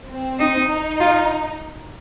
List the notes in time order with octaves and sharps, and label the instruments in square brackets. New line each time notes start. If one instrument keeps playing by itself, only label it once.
[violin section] C4
[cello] D#4
[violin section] D#4
[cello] F4